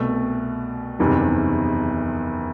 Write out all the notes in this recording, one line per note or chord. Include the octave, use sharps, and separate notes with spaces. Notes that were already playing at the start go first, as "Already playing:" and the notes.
Already playing: C2 B2 A3
F#1 E2 C3 D#3 G3